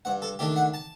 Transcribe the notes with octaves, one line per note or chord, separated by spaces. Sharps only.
G2 F#5
A4
D#3 A3 D4 G4
F#5
A5